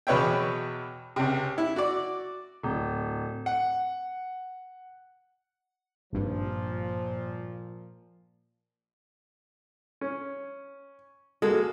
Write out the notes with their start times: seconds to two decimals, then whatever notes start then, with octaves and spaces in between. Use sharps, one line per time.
0.07 E2 B2 B4 C#5 E5 G5
1.16 C#2 C3
1.58 E4
1.76 F#4 D5
2.63 D1
3.46 F#5
6.13 G#1 G2 A#2 F3
10.01 C#4
11.42 G#3 A#3 F#4 A4